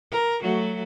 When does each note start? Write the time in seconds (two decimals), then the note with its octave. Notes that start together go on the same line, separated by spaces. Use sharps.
0.11 A#4
0.41 F#3 A3 F#4